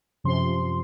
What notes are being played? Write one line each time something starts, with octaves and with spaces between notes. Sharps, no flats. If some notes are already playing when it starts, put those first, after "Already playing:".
F#2 C3 F3 C6